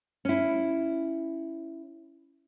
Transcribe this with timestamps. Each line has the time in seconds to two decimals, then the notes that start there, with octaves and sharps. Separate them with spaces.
0.25 C#4 E4